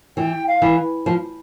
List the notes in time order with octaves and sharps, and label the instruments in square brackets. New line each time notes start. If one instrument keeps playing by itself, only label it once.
[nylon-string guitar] E3 [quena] G5
[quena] F5
[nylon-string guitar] E3
F3